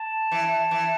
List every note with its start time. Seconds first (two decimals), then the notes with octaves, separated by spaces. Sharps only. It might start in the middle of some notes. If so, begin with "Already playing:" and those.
Already playing: A5
0.31 E3
0.71 E3